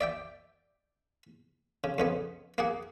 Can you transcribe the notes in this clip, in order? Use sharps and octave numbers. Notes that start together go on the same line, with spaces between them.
D5 E5 G5
C#3
F2 C#3 B3
A#3 G#4 F#5